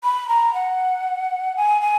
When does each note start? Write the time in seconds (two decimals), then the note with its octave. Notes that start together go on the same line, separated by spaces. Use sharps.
0.03 B5
0.28 A#5
0.54 F#5
1.57 G#5
1.82 G#5